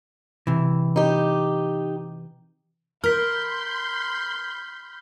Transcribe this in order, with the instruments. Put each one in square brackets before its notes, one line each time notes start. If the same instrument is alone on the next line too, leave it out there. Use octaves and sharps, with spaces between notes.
[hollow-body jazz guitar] C3 E3
[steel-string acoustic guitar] D#4 G4
[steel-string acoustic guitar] A#4 [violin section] B5 C6 G6 [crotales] F6 B6